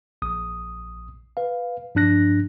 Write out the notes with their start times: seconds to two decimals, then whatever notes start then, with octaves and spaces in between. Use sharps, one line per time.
0.22 A#1 D#6
1.37 B4 F5
1.95 G2 F3 D4 F#6 A#6